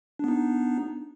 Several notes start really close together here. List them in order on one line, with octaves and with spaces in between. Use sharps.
D4 B3 D#4